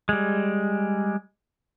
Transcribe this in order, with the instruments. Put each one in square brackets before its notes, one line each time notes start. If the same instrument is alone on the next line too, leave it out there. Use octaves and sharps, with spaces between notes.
[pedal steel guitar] G3 G#3